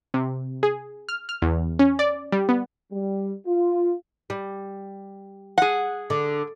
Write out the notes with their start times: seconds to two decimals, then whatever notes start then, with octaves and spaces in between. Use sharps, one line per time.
0.14 C3
0.63 G#4
1.09 F6
1.29 F6
1.42 E2
1.79 C#4
1.99 D5
2.32 G3
2.49 B3
2.92 G3
3.47 F4
4.30 G3
5.58 G#4 F#5
6.10 D3